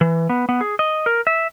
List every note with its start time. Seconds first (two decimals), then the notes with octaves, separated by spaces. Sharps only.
0.01 E3
0.29 B3
0.49 B3
0.61 G#4
0.79 D#5
1.06 A#4
1.27 E5